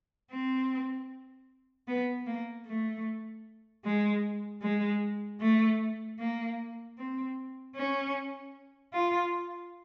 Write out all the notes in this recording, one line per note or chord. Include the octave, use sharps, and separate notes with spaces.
C4
B3
A#3
A3
G#3
G#3
A3
A#3
C4
C#4
F4